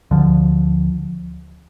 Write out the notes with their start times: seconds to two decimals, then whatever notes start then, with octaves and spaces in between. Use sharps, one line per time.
0.11 D2 D3 F3